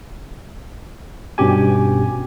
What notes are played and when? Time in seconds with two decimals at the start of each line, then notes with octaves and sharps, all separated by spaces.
1.38 G2 B2 C#4 G4 G#5